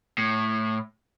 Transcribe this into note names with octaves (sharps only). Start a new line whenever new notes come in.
A2